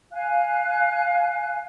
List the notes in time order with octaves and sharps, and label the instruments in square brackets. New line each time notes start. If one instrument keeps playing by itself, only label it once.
[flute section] F5 G#5 F#6